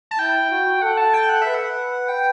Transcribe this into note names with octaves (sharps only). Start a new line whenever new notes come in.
A5
E4 G5
F#4
A4 F#5
A5
G5
F#5
B4 E5
F#5
G5